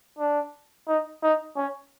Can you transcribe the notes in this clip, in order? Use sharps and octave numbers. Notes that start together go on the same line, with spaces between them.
D4
D#4
D#4
C#4